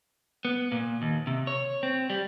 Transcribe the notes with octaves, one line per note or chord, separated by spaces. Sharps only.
B3
A#2
D#2
C3
C#5
C4
G3